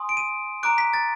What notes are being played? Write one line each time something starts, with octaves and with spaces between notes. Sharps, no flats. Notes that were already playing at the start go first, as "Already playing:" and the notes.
Already playing: G#5 C6 D#6
D7
D#7
A#5 D6 F#6 D7
B6
A6